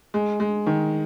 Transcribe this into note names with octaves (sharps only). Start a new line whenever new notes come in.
G#3
G#3
D#3